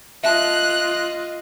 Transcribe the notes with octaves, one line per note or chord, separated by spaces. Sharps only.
F4 D#5 E5 A5 F#6